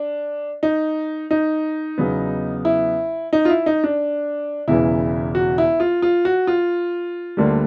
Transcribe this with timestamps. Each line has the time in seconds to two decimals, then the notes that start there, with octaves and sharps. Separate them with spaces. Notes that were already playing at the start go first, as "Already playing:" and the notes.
Already playing: D4
0.63 D#4
1.31 D#4
1.98 E2 C#3 F#3 B3
2.65 E4
3.33 D#4
3.45 F4
3.50 E4
3.66 D#4
3.84 D4
4.68 E1 E2 C#3 E3 E4
5.35 F#4
5.58 E4
5.80 F4
6.02 F4
6.25 F#4
6.47 F4
7.37 D2 D3 G3 A#3